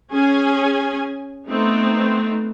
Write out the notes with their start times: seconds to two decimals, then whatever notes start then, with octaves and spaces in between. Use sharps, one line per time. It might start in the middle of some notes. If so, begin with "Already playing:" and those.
0.12 C#4 G#4 G#5
1.50 A3 B3 C4 D#4